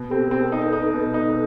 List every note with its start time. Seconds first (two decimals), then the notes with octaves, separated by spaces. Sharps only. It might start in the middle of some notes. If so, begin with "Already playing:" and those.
Already playing: B2
0.10 C4 G4 A4
0.31 C4 G4 A4
0.42 G#4 A#4
0.52 D#4 G#4 A#4
0.62 A4 B4
0.73 D#4
0.94 B2
1.14 D#4